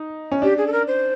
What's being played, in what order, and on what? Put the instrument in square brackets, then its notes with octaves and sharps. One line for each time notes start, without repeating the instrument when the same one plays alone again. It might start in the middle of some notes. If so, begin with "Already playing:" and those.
Already playing: [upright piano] D#4
C#4
[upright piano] D4 [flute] G4
[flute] G#4
A4
A#4
C5